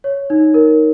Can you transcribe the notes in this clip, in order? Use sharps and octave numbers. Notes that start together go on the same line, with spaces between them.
C#5
D#4
A#4